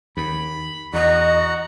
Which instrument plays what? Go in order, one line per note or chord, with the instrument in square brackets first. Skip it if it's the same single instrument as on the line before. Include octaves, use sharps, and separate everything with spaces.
[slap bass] D#2 [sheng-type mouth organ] B5
[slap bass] E2 [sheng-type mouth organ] F#4 F#5 A#5 [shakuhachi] D#5